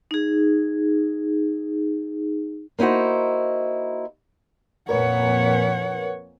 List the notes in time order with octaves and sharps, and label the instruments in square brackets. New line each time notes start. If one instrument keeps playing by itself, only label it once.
[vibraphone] D#4 G#4
[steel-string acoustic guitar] A#3 D#4 E4 F#4 C5
[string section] F2 A#2 [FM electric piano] A#4 B4 [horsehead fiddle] C#5 F#5